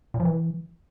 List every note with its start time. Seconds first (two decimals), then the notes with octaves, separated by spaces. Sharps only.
0.14 A#2
0.20 F3
0.25 E3